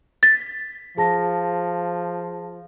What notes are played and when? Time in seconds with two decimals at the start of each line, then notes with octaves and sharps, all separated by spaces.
0.23 A6 B6
0.97 F3 G#4 A5 A#6